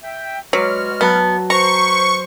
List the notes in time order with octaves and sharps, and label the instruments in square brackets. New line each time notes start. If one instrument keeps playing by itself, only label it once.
[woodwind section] E5 G5
[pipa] F#3 [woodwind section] G#3 F#4 F6 [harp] B4 C#5 D5
[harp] F#3 A5 F#6 [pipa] B3
[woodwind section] B4 C5 [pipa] A#5 [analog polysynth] C#6